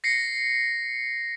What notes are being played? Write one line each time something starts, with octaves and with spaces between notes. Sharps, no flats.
A#6 C7 C#7